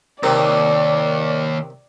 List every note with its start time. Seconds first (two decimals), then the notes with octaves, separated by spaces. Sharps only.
0.23 D#2 C3 D#3 D5